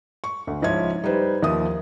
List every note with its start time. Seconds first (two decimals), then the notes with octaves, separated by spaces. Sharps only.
0.24 C#6
0.47 D2
0.62 C#2 G#2 F3 E4 C#5 G#6
1.04 G3 D#4 B4 C5
1.43 D#2 F3 E5 D#6